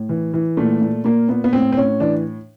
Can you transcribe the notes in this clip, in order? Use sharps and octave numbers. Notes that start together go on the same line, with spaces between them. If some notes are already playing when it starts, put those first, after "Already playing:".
Already playing: A2
E3
E3
A#2 A3
A#2
A#2 A#3
A#2 B3
B3
A2 C4
C4
A2 C#4
E3 D4